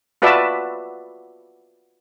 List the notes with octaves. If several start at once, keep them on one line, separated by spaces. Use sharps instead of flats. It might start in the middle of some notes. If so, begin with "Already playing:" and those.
F4 F#4 B4 D5 E5 A5